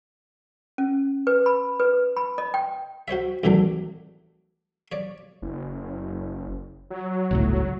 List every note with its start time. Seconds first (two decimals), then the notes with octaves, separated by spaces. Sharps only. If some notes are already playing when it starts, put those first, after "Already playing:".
0.78 C#4
1.27 B4
1.46 B5
1.80 B4
2.17 B5
2.38 D#5
2.54 G5
3.08 F#4 C5 C#5 E5
3.43 C2 A2 D#3 E3 F#3 D4
4.92 C#5 D5
5.42 F#1
6.90 F#3
7.31 G1 C#2 A2 F#3